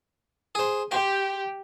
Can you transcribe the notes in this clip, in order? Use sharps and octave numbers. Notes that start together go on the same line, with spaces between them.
G#4 C5
G4 G5 C6